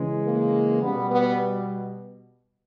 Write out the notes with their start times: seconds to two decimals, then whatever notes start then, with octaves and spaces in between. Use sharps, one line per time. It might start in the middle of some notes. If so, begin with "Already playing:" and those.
Already playing: C#3 E3 G#3
0.23 A#3
0.82 B2 G3 B3
1.11 B3